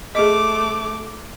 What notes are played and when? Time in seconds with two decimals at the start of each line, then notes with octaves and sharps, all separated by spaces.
0.15 A3 G#4 D#5 D6